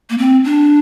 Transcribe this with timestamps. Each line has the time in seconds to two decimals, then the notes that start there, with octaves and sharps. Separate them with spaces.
0.10 A#3
0.18 C4
0.45 D4